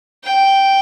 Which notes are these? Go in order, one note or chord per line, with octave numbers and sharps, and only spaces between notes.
G5